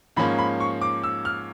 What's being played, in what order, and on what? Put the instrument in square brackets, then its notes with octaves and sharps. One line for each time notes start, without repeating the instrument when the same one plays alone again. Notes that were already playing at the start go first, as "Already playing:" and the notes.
[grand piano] G#2 F3 A#3 C#4 B5
B5
C#6
D6
E6
F6